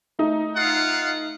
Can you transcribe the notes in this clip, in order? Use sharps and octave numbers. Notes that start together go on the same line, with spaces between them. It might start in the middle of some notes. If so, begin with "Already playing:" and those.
A3 D#4
F4 F5 F#5